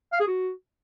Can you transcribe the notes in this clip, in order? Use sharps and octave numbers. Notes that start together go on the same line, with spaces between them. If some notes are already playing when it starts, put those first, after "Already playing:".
F5
G#4
F#4